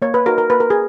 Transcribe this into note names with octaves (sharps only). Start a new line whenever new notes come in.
A#3 C#5
B4
D#4 F#4 A#4
A#4
A#3 B4
A#4
G#4